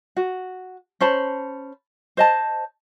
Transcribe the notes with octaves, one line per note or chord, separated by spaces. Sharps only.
F#4
C#4 C5 A5 B5
C5 D#5 A5